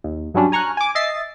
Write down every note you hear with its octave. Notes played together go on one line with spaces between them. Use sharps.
D#2
G2 F#3 G3 C#4 D4
G#5 A#5 C#6 F6 F#6
G#5 D6
D#5 E5 A6 C7